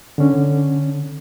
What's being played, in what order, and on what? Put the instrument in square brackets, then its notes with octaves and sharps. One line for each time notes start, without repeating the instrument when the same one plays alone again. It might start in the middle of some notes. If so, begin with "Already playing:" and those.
[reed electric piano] D3 C#4